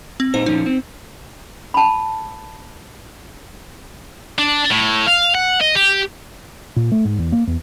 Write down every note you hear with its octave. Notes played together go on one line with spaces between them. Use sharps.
C4
A#2 D#4 C5
A#2 F3 C#4 D#4
C4
A5 B5
D4
A2
F5
F#5
D#5
G4
A#2
A3
G#2
E2
A#3
E2